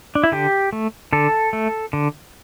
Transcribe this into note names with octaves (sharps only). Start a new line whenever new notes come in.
D4
E4
D3 G4
A3
D3 A4
A3
D3